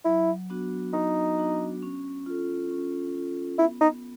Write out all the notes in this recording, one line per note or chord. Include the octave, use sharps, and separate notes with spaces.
F#3 E4
B3 D4 F#4
F#3 D#4
B3 D4 F#4
C#4
F4 A4
C#4
F4 A4
B3 E4
D#4